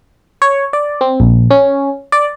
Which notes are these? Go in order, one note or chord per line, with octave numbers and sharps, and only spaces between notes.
C#5
D5
C4
A#1
C#4
D5